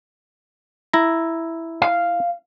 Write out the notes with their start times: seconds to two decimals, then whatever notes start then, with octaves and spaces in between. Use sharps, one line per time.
0.93 E4 A#5
1.82 F5